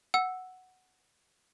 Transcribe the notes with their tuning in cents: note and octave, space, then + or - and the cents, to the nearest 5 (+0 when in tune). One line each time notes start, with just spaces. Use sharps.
F#5 +0 E6 +0